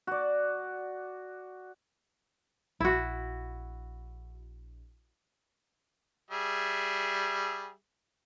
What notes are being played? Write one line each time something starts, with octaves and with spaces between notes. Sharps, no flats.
F#4 D5
A#1 E4 F#4
G3 G#4 E5